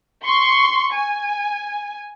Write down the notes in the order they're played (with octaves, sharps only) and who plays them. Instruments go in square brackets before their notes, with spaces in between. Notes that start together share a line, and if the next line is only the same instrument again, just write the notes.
[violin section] C6 C#6
G#5